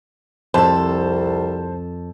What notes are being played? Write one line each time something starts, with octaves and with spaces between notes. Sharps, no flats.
C2 F2 A4 C5 A5